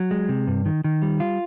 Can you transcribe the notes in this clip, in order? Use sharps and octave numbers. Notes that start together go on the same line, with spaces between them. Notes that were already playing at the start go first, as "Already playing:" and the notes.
Already playing: F#3
G#3
C3
G2
D#3
D#3
G3
F4